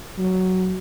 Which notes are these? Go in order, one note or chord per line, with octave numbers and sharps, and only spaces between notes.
F#3